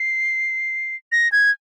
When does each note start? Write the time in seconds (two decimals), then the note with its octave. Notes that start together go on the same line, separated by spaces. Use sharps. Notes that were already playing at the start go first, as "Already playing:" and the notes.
Already playing: C7
1.12 A#6
1.32 G#6